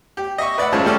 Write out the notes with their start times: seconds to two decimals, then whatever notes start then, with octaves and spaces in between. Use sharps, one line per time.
0.17 G4
0.38 D#5 E5 C#6
0.58 B4 D5 E5 F#5
0.72 F#2 G#3 F4 C5 C#5 A5
0.85 D#2 G3 A3 C#4 D5